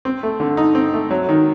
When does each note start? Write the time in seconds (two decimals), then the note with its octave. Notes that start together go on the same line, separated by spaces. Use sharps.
0.05 C4
0.23 A3
0.40 D3
0.57 D#4
0.75 C4
0.93 A3
1.11 F#3
1.29 D#3